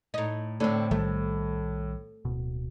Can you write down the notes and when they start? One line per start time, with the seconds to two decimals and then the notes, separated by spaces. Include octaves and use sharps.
0.14 A2 D#4
0.60 A2 D3 C4
0.91 B1 D#3 G3 A3
2.25 D1 B2